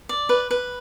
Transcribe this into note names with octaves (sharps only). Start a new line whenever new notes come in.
D5
B4
B4